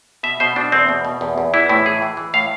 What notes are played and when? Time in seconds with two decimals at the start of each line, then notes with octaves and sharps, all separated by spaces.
0.23 B2 E5
0.40 B2 C5
0.56 B2 D4
0.72 E2 C4
0.89 B2
1.05 B2
1.21 E2
1.38 E2
1.54 E3 E4
1.69 A2 E4
1.86 E3 G#4
2.02 E3
2.17 E3
2.34 A2 F5